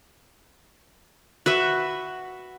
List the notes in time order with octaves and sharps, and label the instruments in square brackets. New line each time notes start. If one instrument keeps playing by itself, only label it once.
[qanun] F#4 B4 E5